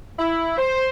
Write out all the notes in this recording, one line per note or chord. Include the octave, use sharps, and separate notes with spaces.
E4
C5